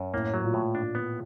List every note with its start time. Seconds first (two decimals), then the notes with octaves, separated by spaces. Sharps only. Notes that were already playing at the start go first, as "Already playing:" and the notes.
Already playing: F#2
0.14 A2 A#3
0.34 F#3
0.44 A#2
0.54 A2
0.75 D4
0.95 B3